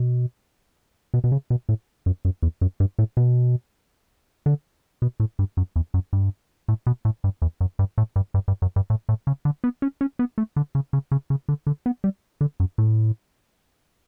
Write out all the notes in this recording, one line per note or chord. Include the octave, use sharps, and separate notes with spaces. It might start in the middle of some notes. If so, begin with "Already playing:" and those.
Already playing: B2
B2
B2
C#3
B2
A2
F#2
F#2
E2
F#2
G2
A2
B2
D3
B2
A2
G2
F#2
E2
F#2
G2
A2
B2
A2
G2
E2
F#2
G2
A2
G2
G2
G2
F#2
G2
A2
A2
C#3
D3
B3
C#4
C#4
B3
A3
D3
C#3
C#3
C#3
C#3
D3
D3
B3
G3
D3
F#2
A2